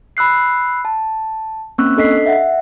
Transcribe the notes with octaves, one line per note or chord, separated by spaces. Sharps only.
B5 E6 F#6 C7
A5
A#3 C4 C#4 C#6 E6 F#6
D4 A4 D#5 B6 C7
E5 F#5